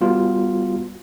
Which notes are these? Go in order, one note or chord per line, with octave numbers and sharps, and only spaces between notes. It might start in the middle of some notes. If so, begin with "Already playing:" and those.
G3 B3 F4 F#4